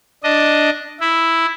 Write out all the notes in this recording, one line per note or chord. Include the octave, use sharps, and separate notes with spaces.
D4 D#5
E4